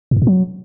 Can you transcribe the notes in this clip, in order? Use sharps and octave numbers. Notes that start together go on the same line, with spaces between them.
A2
F#2
A#2
F#3